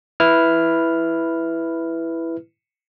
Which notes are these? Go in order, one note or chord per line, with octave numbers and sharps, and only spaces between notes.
E4 B4 F6